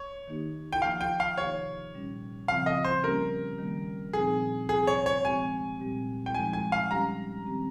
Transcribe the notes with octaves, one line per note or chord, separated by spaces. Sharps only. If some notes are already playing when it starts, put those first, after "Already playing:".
Already playing: C#5
D#3 A#3 D#4 G4
G5
F3 A#3 F4 F5
G5
F5
C3 D#3 A#3 D#4 G4 C#5
A#2 G3 C#4 G4
C#3 F3 C4 F4 F5
D#5
C5
G3 A#3 C#4 G4 A#4
D#3 G3 A#3
A#2 F3 C4 D#4 G#4
C3 F3 C4 G#4
C#5
C#5
F3 G#3 C4 G4 G#5
A#2 G3 C4 G4
G5
F3 G#3 D#4 G#5
G#5
F5
G3 C#4 G4 A#5
D#3 G3 C4 G4